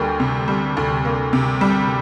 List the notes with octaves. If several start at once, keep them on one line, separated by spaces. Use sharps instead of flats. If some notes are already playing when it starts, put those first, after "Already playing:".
Already playing: D2 G3 A#3 G5
C3
G3
D2
A#3
C3
G3